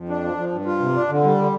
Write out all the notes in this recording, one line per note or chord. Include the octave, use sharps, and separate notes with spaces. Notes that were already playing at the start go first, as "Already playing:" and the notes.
Already playing: F2
D4
F3
F3
G2
F4
C3
D4
D3
G3
D3